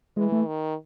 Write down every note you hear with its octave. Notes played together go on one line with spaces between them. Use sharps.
E3 G#3
A3
D#3